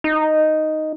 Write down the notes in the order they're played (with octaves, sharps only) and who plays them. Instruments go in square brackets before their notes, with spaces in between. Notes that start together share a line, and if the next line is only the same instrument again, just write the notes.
[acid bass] D#4